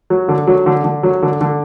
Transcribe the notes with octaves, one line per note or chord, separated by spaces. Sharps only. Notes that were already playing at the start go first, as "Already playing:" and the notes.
F#3
D3
F#3
D3
D3
F#3
D3
D3